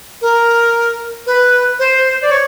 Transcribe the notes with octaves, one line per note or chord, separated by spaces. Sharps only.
A#4
B4
C5
D5
C#5